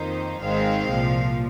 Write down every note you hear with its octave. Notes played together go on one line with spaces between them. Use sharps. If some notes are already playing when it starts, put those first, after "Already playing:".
Already playing: F2 D#3 A#3 D#4 C5
G#1 G#2 D#3 G#3 C4 F5
C2 A#2 F3